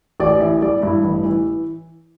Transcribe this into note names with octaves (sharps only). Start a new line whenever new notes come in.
A1 D5
E3 E5
G3 D5
G2 E4
A1
E3